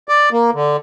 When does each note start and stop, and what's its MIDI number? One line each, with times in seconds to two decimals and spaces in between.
0.09 0.29 74
0.32 0.51 58
0.54 0.77 50